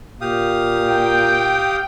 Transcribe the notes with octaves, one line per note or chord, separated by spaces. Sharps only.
A#2 G4 F5 D#6
G5